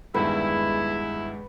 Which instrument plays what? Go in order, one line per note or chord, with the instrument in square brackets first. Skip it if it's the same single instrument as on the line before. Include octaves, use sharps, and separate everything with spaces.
[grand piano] E2 G2 D#3 [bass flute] G#3 [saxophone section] E4 [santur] B4